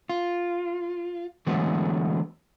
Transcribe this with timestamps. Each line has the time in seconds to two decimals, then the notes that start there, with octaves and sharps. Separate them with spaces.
0.09 F4
1.47 D3 E3 F#3 G#3 A3 B3